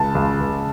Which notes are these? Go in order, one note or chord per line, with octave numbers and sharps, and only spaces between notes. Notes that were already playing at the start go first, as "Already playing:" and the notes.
Already playing: C#2 A5
C#2
C#2